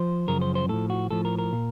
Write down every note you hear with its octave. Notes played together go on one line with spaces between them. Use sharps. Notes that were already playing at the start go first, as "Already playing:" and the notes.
Already playing: F3 C5
F#2 C#3 F3 A#4
C5
C5
A2 F3 A4
F#4
A2 F3 A4
A#4
A#4
A#2